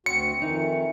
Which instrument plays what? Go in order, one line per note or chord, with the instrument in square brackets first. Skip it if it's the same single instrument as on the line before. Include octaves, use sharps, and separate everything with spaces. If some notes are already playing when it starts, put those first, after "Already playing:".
[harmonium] D2 F#4 [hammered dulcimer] C4 C#5 [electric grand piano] C#7
[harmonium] F2 D#3 [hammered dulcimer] E3 D5 [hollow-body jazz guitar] D#4